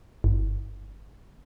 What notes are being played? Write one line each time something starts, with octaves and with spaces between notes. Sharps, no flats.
G1